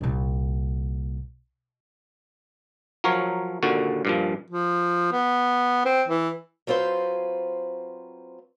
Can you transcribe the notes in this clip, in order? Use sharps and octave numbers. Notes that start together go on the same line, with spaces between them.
C2 A#2
F3 F#3 A#4 C#5
D#2 A#2 D3 F#4
G2 A#2 F3
F3
B3
C4
E3
F#3 C4 F4 B4 C5